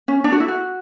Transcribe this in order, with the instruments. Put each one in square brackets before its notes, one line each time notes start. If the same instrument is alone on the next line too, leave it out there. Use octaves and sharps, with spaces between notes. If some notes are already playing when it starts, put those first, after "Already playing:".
[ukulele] C#4
D4
F#4
E4
F#4